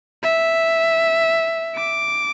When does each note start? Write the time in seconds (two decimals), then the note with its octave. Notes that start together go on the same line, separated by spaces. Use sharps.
0.23 E5
1.75 D6